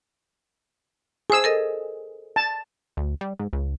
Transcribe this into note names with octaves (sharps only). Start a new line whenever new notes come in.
G#4 C5 G#5 E6
A4 A#4 D#5
A5
D2
G3
G#2
C#2